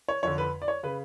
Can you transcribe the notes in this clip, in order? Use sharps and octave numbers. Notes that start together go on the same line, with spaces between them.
C#5
F2 D3 C#5
B4
D5
C#5
C#3 B4